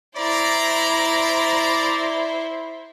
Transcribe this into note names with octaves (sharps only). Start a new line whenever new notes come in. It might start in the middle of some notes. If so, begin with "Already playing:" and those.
E4 C5 D5 A#5